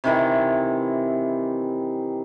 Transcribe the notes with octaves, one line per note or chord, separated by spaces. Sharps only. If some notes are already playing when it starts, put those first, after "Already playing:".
C3 D#3 E3